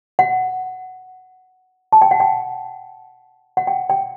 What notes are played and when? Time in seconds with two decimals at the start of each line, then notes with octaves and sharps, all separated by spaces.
0.19 F#5
1.92 A5
2.02 G5
2.11 F#5
2.20 G5
3.57 F#5
3.67 G5
3.90 G5